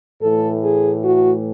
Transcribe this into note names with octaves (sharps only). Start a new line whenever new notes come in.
A2 E3 A3 A4
G#4
F#4